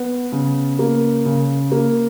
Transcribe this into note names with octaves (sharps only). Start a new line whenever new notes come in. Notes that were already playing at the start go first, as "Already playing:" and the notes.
Already playing: B3
C#3
A#3
C#3
A#3